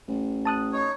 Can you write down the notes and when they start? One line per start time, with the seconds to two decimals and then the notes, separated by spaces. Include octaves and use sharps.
0.08 A1
0.45 A5 D#6 F#6
0.73 D#4 C#5